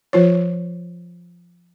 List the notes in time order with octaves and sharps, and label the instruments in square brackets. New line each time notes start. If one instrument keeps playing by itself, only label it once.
[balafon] F3 F4 C#5